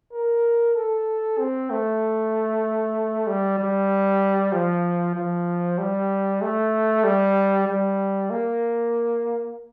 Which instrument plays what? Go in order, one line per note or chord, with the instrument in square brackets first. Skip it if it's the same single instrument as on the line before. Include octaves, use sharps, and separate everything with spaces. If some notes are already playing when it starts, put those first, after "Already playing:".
[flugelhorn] A#4
A4
C4
A3
G3
G3
F3
F3
G3
A3
G3
G3
A#3